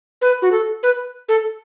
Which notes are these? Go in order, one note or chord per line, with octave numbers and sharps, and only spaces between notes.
B4
F#4
A4
B4
A4